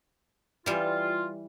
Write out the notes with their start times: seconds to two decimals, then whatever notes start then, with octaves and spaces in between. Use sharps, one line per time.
0.66 E3 G3 F4